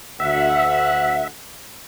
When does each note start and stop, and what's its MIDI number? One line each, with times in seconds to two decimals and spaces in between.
0.20 1.24 38
0.20 1.27 76
0.20 1.24 78